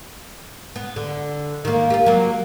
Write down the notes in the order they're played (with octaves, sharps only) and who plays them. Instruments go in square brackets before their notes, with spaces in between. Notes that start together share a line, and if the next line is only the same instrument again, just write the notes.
[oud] B3
D3
D#3 A#3
F4 G4
F#3 A#3